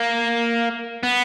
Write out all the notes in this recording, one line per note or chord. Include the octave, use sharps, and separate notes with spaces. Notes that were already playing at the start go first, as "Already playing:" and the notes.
Already playing: A#3
B3